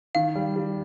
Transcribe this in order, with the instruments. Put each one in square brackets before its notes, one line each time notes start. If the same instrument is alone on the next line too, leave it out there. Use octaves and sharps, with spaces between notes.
[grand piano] D#3 [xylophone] F5
[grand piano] G3
G3